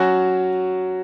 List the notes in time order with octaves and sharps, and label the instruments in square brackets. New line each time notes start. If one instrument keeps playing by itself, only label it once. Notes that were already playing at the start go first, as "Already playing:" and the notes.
Already playing: [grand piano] F#3 C#4 F#4